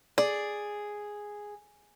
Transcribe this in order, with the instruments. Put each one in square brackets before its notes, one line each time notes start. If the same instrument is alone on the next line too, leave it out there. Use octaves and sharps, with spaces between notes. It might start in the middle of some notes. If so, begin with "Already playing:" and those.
[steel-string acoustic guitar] G#4 [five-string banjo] D5